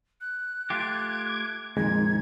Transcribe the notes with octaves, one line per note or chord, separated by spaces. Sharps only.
F#6
A3 F4 G4 D6 G#6
F2 A#2 D#3 G#3 G#6